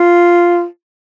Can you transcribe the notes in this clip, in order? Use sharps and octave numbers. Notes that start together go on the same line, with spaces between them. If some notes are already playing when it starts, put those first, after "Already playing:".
Already playing: F4